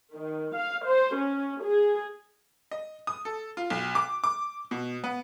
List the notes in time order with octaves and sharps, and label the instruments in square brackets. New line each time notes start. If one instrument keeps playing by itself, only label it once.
[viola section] D#3
F5
C5
C#4
G#4
[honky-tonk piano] D#5
D#6
A4
F4
B1
D6
D6
B2
B3